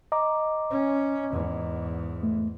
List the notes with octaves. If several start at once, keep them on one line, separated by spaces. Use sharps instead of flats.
D#5 A#5 D6
C#4
E2 G#2
A3